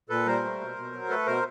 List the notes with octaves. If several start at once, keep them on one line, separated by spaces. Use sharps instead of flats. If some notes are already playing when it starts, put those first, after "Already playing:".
A#2 A4 B4
G3 A#4 C5
A3
B2
B2
F#3
A3 A4 B4
B2 A#4 C5